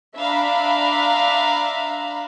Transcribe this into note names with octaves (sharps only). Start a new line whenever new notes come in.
D4 E5 F5 A#5 B5